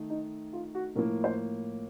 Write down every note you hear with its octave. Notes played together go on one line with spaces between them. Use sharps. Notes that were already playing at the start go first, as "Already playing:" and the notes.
Already playing: D#3 A3
D#4
F4
F#4
A2 F3 A#3 A#4
C5